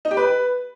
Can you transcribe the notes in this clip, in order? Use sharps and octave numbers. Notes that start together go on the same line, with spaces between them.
D#4
G4
B4